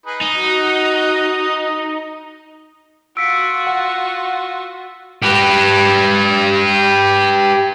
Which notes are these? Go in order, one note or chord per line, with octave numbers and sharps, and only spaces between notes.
D#4 G#4 B4
D#4 D#5
F#4
F4 F#4 E6 B6 C#7 D7
F#5
G4 B4